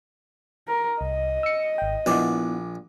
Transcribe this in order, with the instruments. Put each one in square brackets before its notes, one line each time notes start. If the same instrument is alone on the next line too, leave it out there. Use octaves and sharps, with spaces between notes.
[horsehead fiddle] A#4
[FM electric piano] C2 [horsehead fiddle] D#5
[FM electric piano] E6 C#7
G#1 G5
[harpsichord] A#1 D5 [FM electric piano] B3 E4 F#5